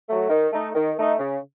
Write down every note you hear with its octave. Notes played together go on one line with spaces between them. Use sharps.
F#3 A3
D#3
A3 D#4
D#3
A3 D#4
C#3